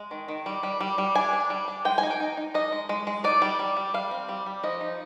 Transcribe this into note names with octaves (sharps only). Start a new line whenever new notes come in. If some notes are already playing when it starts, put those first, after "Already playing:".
Already playing: G#3
D#3
D#3
G3
G3
G3
G3
D4 G#5
D4
G3
D4
G#3 G5
G#5
D#4
G5
D#4
D#4
D#4 D#5
G#3
G#3
G#3
D#4 D5
G3
G3
G3
G3 F5
C4
G3
G3
F3 D#5
D#4